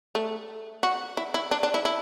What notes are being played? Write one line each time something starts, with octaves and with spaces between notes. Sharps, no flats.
A3
F#4
E4
E4
D4
D4
E4
E4